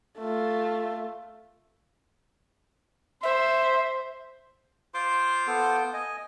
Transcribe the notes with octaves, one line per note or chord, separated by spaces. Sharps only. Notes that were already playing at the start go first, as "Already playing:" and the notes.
A3 F4
C5 E5
F4 C5 C6 D6
B3 A4
D#5 G#5